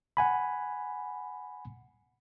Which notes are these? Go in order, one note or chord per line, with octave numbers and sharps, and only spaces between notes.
F#5 G#5 B5